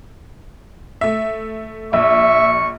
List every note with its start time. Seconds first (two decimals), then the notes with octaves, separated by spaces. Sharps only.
1.01 A3 E5
1.93 A#1 E5 C#6